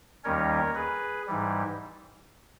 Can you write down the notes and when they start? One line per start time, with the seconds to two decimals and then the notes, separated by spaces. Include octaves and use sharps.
0.24 D#2 D#3 G3 C#4 A#4 C#5
0.75 G#4 B4
1.27 G#2 E3 G3